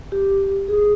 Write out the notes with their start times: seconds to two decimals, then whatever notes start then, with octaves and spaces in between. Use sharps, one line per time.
0.12 G4
0.68 G#4